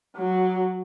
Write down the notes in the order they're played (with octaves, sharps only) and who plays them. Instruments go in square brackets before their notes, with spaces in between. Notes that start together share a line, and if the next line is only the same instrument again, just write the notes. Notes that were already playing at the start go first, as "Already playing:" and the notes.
[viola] F#3